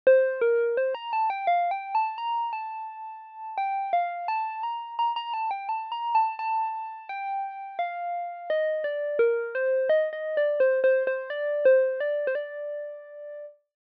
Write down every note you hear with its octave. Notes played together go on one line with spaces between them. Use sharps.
C5
A#4
C5
A#5
A5
G5
F5
G5
A5
A#5
A5
G5
F5
A5
A#5
A#5
A#5
A5
G5
A5
A#5
A5
A5
G5
F5
D#5
D5
A#4
C5
D#5
D#5
D5
C5
C5
C5
D5
C5
D5
C5
D5